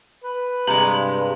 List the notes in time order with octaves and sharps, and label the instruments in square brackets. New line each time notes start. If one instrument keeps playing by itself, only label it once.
[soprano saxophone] B4
[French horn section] G2 [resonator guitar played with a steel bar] C3 G#3 [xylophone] A#5 F#7